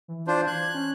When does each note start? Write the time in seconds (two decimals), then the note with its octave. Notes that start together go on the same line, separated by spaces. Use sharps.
0.08 E3
0.27 D4 F4 C5
0.47 F#6 G#6
0.75 C#4